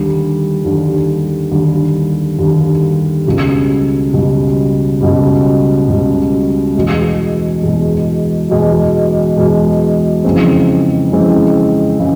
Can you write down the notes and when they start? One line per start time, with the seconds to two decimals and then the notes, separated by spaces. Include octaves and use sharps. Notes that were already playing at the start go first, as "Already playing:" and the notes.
Already playing: D#2 D3 G3
0.64 D#2 D3 G3
1.52 D#2 D3 G3
2.39 D#2 D3 G3
3.26 C#2 B2 G3
4.13 C#2 B2 G3
5.01 C#2 B2 G3
5.88 C#2 B2 G3
6.75 E2 B2 G#3
7.63 E2 B2 G#3
8.50 E2 B2 G#3
9.37 E2 B2 G#3
10.24 F2 C#3 E3 G#3 C4
11.12 F2 C#3 E3 G#3 C4
12.00 C#3 E3 G#3